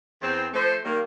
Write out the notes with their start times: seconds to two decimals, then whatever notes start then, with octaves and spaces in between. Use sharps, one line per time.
0.22 E2 E3 C4
0.54 F3 A3 C5
0.85 D#3 G3 A#3